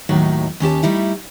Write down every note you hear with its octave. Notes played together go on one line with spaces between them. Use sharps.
D#2 A2 F#3 D#4
D#2 C#4 G4 A5
G3 A3 D#4 E4